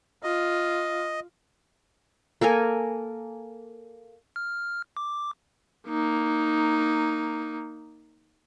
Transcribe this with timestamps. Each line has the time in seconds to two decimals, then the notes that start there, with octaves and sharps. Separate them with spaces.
0.24 F4 D#5
2.41 A#3 A4 A#4 G#5
4.36 F6
4.97 D6
5.88 A#3 D#4